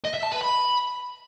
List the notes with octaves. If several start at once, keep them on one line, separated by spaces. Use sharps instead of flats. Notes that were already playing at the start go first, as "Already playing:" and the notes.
D#5
E5
A5
B4
B5